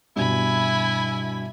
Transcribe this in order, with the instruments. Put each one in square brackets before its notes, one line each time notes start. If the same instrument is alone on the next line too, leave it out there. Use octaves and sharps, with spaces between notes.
[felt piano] G2 B2 [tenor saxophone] E4 [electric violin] G#5 B5